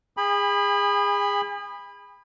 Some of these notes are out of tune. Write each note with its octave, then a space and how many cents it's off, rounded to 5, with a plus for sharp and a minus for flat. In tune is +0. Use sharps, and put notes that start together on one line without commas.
G#4 -30 G#5 -45 B5 +0